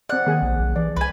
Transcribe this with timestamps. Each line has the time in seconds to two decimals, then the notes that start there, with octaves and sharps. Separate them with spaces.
0.09 C4 D5 F#5
0.26 D#3 A#3 G#4 G#5
0.42 A#1
0.59 B1
0.76 E3 D5
0.96 C2 B4 G#5